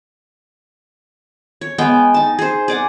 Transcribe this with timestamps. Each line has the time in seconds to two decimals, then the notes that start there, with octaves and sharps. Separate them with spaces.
1.61 C#5
1.78 G#3 B3 G5
2.14 D#4 A5
2.39 G#4 C5
2.68 G#4 D5 F#5